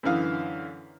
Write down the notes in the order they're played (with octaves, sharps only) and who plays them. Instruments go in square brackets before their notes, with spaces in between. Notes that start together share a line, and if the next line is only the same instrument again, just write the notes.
[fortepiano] F#2 D3 E3 F5 D#6